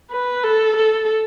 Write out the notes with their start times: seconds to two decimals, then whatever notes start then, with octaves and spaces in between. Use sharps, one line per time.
0.11 B4
0.43 A4
0.76 A4